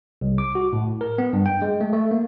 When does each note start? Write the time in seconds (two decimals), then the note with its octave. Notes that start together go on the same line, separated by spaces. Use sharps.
0.21 C2
0.38 D6
0.55 F#4
0.73 A2
1.01 A#4
1.18 B3
1.33 G2
1.46 G5
1.62 G#3
1.81 A3
1.93 A3
2.11 A#3